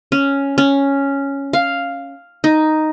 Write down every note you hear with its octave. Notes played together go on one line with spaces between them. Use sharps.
C#4
C#4
F5
D#4